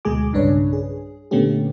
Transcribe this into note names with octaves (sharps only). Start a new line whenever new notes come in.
D2 B2 G#3 G#4 G#5 D6
B1 G2 C#3 D4 B4 C#5
G#4
A#2 D3 A3 B3 C#4 G4